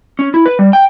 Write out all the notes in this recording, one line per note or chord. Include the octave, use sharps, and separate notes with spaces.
C#4
E4
B4
G3
G5